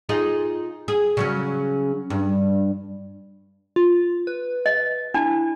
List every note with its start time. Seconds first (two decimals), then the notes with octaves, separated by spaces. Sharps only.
0.09 D#4 F4 G#4
0.88 G#4
1.17 C#3 F#3 C#4
2.10 G2
3.76 F4
4.27 B4
4.66 D#5
5.14 D4 E4 A5